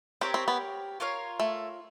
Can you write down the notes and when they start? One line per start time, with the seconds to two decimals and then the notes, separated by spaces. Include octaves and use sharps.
0.21 C4 G4 A#4 C#5
0.34 C4
0.48 B3
1.00 F4 A#4 C#5 F5
1.40 A3